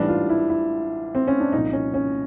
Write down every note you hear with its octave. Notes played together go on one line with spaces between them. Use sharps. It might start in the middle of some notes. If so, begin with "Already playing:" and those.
Already playing: A1 G#2 E3 G3 D4
F4
E4
E4
C4
C#4
D4
C2 A#2 F3 D#4
C#4
C#4